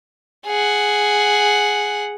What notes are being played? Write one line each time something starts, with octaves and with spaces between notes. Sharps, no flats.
G#4 F#5